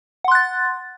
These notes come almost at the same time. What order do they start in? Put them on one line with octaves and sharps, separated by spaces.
F#5 C6 F#6 A6